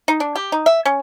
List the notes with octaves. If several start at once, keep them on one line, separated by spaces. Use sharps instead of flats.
D#4
D4
G4
D#4
E5
C#4